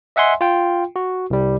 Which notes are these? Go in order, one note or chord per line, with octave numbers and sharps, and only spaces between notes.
D#5 E5 F#5 G#5 C6
F4 G5
F#4
C2 G3